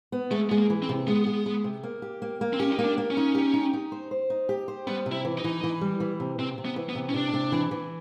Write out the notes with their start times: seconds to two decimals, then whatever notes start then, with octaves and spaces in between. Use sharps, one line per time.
0.12 B3
0.31 G#3 A3
0.49 G#3 B3
0.57 A#3
0.70 E3
0.82 C4
0.89 C3
1.07 G#3 B3
1.26 G#3
1.46 G#3
1.64 C3
1.83 A#3
2.02 G4
2.22 A#3
2.41 A#3
2.53 C4
2.59 C#4 G4
2.72 D#4
2.79 A#3
2.85 D4
2.98 A#3
3.11 C#4
3.17 D#4
3.35 G4
3.54 D#4
3.73 D#4
3.92 C5
4.11 C5
4.30 D#4
4.49 G4
4.68 C5
4.87 G3 B3
5.06 C3
5.12 E4
5.25 E3
5.38 D#4
5.44 E3
5.64 E3
5.81 G3
6.00 E3
6.20 C3
6.39 C3 C4
6.58 C3
6.65 B3
6.76 E3
6.89 B3
6.95 C3
7.09 C#4
7.14 C3 D4
7.33 C3
7.52 E3
7.71 E3